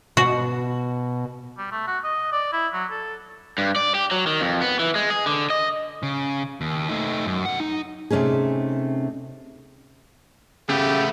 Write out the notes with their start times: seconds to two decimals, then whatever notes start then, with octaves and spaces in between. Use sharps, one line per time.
0.17 B2 F#4
1.58 G3
1.72 A3
1.87 F#4
2.04 D#5
2.32 D5
2.53 E4
2.73 F#3
2.91 A4
3.58 G2
3.76 D5
3.95 G4
4.11 F#3
4.27 D#3
4.41 F2
4.62 B3
4.79 E3
4.95 G#3
5.10 G#4
5.26 D3
5.50 D#5
6.03 C#3
6.61 D#2
6.89 A3 D#4
7.26 F#2
7.45 C3 F#5
7.60 D#4
8.10 C3 A3 C#4 D#4 G#4
10.69 C#3 A3 B3 G4